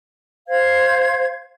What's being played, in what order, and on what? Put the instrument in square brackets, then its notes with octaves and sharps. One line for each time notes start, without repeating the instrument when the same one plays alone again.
[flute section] C5 F5 G#6